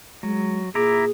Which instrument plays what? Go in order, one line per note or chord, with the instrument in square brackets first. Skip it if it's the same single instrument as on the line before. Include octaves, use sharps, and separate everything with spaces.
[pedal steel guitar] F#3 [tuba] G#3
[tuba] A#2 [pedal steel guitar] E4 A#5 D6 [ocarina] G#4